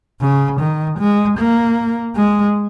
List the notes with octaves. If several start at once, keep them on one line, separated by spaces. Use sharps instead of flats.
C#3
D#3
G#3
A#3
G#3